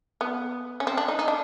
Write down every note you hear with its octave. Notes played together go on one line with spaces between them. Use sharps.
B3
C#4
C4
D4
D#4
D#4
D4